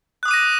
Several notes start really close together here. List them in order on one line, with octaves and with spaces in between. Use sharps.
F#6 D#6 D6 D#7 A#6